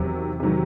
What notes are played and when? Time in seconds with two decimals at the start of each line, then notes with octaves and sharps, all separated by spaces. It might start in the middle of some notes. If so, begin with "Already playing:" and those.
Already playing: E2 C3 D#3 F#3
0.40 C3 D#3 F#3